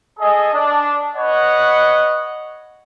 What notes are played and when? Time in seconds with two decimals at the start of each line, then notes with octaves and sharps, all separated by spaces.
0.19 G#4 A4 D#5 G#5
0.52 D4
1.15 B4 C#5 D#5 F#5